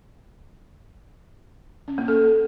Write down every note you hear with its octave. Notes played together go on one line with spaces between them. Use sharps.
C#4
A#3
A4